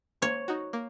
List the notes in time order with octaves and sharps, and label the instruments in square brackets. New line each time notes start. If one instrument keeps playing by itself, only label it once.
[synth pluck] A#3 [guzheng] C#5
[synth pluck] D#4 F#4
A#3